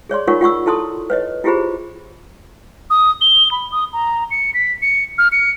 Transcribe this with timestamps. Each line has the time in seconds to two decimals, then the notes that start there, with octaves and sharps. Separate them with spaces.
0.09 G#4 C#5 D5 C6
0.27 D#4 F4 A#4 C#5 F#5 C#6
0.41 F4 F#5 C#6 E6
0.66 E4 A4 A5 C6 D#6
1.10 B4 C#5 D#5
1.44 E4 F4 G4 G#4 C5 B5
2.90 D#6
3.21 G7
3.51 B5
3.72 D#6
3.93 A#5
4.31 C#7
4.54 B6
4.82 C#7
5.18 F6
5.32 C#7